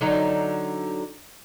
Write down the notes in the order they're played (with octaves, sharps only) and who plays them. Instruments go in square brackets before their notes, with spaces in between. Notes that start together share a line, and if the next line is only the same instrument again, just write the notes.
[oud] D3 F#3 D#4